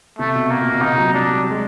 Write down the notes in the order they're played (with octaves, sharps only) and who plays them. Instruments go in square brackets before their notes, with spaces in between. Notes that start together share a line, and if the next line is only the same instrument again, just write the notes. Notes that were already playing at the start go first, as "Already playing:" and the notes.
[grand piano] C3 [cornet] A3
[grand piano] B2
[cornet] A#3
[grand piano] A#2
B2
[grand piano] C3 [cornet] D#4
[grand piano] F#3
[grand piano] G3 [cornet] D4
[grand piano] G3
G#3